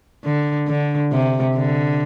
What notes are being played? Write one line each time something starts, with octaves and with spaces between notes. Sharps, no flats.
D3
D3
C3
D3